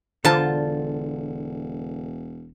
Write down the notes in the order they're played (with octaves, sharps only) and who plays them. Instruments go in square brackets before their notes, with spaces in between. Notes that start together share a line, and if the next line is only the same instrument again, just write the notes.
[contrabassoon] E1 [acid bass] D3 [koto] F4 A5 [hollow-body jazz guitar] A4 C5 A#5